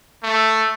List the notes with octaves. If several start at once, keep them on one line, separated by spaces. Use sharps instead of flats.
A3